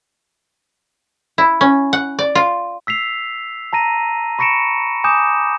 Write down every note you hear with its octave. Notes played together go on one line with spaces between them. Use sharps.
E4
C#4
F#5
D5
F4
E6 B6 C7 F7
A5 A#5 A#6 D#7
B5 C#6 A#6 C#7 D7 E7
G#5 D6 D#6 G6 E7